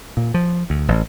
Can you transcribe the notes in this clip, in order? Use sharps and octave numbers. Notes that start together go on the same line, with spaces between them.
A#2
F3
D2
A1